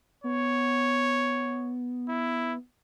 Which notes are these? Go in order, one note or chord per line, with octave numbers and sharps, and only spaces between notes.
B3 C#5
E4